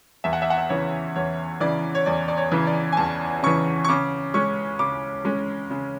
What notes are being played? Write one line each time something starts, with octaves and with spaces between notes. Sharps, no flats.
E2 E5
F#5
E5
F#5
E5
C#3 E3 C#5
E2 C#5
C#3 E3 D5
C#5
E2 D5
D5
C#5
C#3 E3
D5
G#5
E2 A5
C#3 E3 C#6
C#6
C#3 D6
G#3 C#4 C#6
C#3 D6
G#3 C#4
C#3